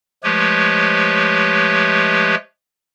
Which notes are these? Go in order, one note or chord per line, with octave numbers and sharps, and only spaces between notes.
F3 G#3 A3 G4 B4 C#5